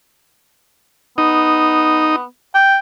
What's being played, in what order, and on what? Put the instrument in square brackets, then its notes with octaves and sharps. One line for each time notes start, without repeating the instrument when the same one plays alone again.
[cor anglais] B3 [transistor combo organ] D#4
[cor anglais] G5